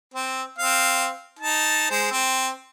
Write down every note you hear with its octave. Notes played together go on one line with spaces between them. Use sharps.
C4
C4 F5
D#4 A5
G#3 C5
C4